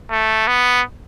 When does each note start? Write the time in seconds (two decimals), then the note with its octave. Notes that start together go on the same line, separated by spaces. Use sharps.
0.10 A3
0.47 B3